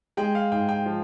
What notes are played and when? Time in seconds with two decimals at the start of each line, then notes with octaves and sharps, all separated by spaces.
0.17 G#3 G5
0.35 F5
0.52 G#2 G5
0.69 G5
0.86 F3